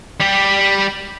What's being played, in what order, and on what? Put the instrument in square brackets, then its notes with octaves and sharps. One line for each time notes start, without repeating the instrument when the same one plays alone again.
[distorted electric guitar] G3 G4